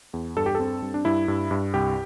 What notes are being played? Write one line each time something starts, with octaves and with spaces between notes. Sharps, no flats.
E2
G2 A4
G4
C4 A4
G2
D4
G2 E4
G2
G2
C2 G4